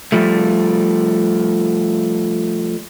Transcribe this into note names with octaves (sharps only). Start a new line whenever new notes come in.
F3 G3 A3